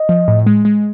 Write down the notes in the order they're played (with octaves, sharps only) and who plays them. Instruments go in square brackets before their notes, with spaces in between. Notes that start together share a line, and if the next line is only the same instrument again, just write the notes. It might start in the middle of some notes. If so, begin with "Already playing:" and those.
Already playing: [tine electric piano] D#5
[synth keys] F3
A2
G#3
G#3